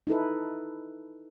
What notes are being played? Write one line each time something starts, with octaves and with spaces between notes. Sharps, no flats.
D#4 E4 A4 B4